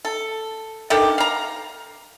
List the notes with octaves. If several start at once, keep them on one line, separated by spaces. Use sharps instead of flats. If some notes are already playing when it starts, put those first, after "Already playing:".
A4
D3 D#3 G4 A4
F5 A#5